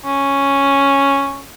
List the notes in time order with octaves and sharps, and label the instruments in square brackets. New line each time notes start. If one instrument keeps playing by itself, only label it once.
[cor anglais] C#4